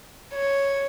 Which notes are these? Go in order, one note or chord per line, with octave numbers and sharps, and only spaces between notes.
C#5